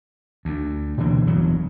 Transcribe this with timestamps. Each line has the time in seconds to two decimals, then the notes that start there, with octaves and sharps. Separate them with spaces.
0.45 D2
0.98 B2 D3 E3 A#3
1.27 G1 E2 F#3